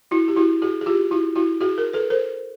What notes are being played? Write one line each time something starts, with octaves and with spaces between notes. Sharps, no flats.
E4 F#4
G4
E4 F#4
F#4 G#4
G#4
F4 G4
E4 F#4
E4 F#4
F#4 G#4
G#4 A#4
A4 B4
A#4 C5